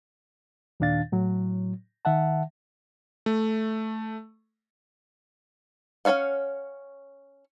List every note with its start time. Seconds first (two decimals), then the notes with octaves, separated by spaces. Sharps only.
0.80 D#2 A#2 D#3 D4 F5 A6
1.12 A2 F#3
2.05 D#3 E5 F#5 A5
3.26 A3
6.05 C#4 B4 C#5 F5 F#5